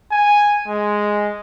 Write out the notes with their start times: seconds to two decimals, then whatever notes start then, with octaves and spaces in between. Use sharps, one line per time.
0.12 G#5
0.68 G#3